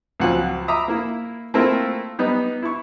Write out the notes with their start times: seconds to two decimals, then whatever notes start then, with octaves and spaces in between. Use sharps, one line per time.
0.20 C#2 F3 F#3 C4 F#5 G#5
0.68 E5 A#5 B5 D6 D#6
0.88 A#3 E4
1.54 A3 A#3 C4 E4 F4 A#4
2.19 G3 B3 D#4
2.62 E4 C#6